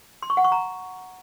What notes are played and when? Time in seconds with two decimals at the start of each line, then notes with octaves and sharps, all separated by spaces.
0.22 C6
0.30 C#6
0.37 F#5
0.44 C#6
0.52 A#5